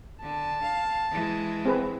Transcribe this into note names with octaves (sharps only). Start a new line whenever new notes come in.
D3 A5
F5
E3 G#3
C4 G#4 B4